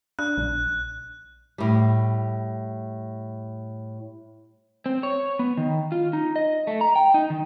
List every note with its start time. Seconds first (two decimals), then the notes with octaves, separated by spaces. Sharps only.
0.19 D4 F#6
0.38 A#1
1.58 A2 G3
4.86 C4
5.03 C#5
5.39 B3
5.57 D#3
5.92 F4
6.13 D#4
6.36 D#5
6.67 A3
6.81 A#5
6.96 G5
7.14 D#4
7.30 D#3